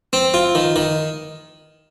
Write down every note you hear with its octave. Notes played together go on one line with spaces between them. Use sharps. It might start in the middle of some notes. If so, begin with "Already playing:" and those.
C4
F4
D#3
D#3